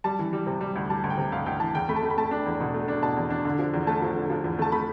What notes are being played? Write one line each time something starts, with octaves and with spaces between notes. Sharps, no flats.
G3 A5
E3
G3
C3
G3
D2
G3 A5
D2
G5
C3
D2 F5
D2 G5
E3 A5
E2 G5
A3 B5
A5
A3
B5
A3 A5
D4
E2
B2
A3
D4
B2 A5
E2
D4
D3
F3
E2
A3 A5
F3
D3
F3
E2
A3 A5
A3 B5